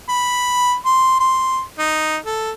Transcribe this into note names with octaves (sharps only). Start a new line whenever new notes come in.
B5
C6
C6
D#4
A4